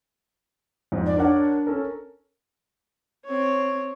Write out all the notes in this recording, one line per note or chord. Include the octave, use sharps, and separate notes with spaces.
F2 G#2
D5
D4 A#4 C#5 F#5
C#4 A4 A#4
C4 C#5